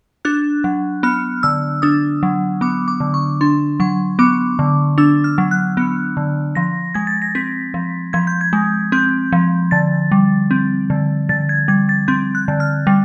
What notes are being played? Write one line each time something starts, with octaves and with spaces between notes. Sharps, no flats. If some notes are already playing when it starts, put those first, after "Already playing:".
D4 F#6
F#3
B3 F6
D3 E6
D4 D#6
F#3
B3 D6
D6
D3
C#6
D4 C6
F#3 C#6
B3 D6
D3
D4 E6
F6
F#3
F#6
B3
D3
F3 A#6
G#3 G#6
A6
A#6
C4 B6
F3
F3 G#6
G6
G#6
G#3
C4 G6
F3
D3 A6
G3
C4
D3
D3 A6
G#6
G3 G#6
A6
C4 G6
F#6
D3
F6
G3